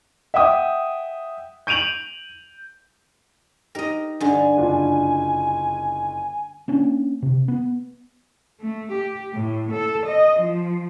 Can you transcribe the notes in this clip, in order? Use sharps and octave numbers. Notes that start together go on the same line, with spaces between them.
E5 F#5 G5 D#6
G6 D7 D#7 F7 F#7
D#4 G4 A#4 D#5
G2 D3 G#5
F#1 D4 F4
A#3 C#4 D4
C3
B3
A3
G4
A2
A4
D#5
F3